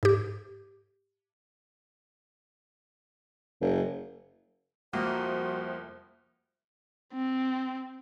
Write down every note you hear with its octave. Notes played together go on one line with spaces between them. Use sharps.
G#2 G4
F#1
C2 F2 A#3 F#4 C5
C4